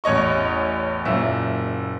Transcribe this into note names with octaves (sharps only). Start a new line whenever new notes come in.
A1 E2 C#5 D#5 C#6
F#1 A#2 E5